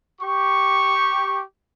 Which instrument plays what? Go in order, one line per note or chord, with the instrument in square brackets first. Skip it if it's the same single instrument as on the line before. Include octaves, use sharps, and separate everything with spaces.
[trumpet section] G4 C#6